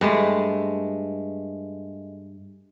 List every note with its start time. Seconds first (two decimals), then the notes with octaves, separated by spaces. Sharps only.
0.01 G2 G#3 A3